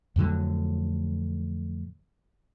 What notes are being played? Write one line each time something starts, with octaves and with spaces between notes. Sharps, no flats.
F2 A2 D3 F#3